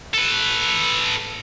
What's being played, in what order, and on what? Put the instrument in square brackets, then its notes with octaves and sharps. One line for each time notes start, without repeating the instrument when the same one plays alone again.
[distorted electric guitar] A4 B4